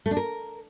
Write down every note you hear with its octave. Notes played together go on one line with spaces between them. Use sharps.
A3
D4
A#4